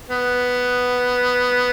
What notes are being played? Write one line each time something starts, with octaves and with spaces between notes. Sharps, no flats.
B3